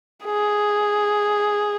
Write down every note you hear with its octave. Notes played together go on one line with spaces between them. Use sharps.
G#4